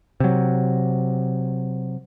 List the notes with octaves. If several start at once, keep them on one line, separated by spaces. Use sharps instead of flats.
C3 F#3